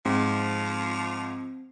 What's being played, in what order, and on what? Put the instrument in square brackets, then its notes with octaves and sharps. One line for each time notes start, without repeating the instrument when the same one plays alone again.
[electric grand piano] G#2 [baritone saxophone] F3 [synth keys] C4